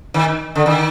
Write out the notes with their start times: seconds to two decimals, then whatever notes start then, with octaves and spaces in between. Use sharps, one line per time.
0.14 D#3
0.55 D3
0.66 D#3